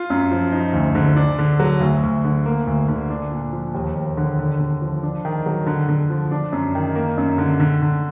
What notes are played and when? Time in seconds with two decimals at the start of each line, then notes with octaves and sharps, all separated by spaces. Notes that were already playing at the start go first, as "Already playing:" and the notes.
Already playing: F4
0.10 F#2
0.31 F3
0.52 D#4
0.73 D2
0.95 D3
1.16 D4
1.38 D3
1.59 F#3
1.80 D2
2.03 D2
2.24 D3
2.45 A#3
2.67 D2
2.88 D3
3.10 D4
3.31 A#2
3.53 F3
3.74 D#2
3.95 D#2
4.17 D3
4.39 D3
4.59 D3
4.82 F3
5.03 D4
5.25 D#3
5.46 F#3
5.67 D3
5.88 D3
6.10 F3
6.31 D4
6.52 F#2
6.75 D#3
6.95 A#3
7.18 F#2
7.38 D3
7.60 D3
7.82 D3